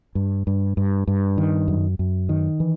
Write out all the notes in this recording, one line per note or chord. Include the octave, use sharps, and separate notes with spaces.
G2
G2
G2
G2
D#3
F#2
F#2
D#3
E3